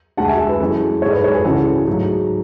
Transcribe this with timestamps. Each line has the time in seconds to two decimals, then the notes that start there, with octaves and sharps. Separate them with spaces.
0.17 D2 D3 G#3 F#5 A5
0.28 E5 G#5
0.39 E5 G#5
0.49 G#4 B4
0.60 F#2 E3 G#3 F#4 A4
1.02 G#2 G#3 A4 C#5
1.12 B4 D5
1.24 A4 C#5
1.34 G#4 B4
1.44 C#2 C#3 E3 F#4 A4
1.87 G#2 F#3 A3